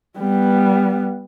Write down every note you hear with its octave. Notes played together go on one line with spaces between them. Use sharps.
G3 B3